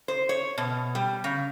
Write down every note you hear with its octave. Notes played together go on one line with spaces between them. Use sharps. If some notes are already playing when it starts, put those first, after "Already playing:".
C5
C#5
B2
G3
C#3